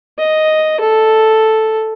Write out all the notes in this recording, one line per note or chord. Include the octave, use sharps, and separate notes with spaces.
D#5
A4